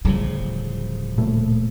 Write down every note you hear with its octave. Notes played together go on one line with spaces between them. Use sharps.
D1 C#3 F3 G3
A#2 A3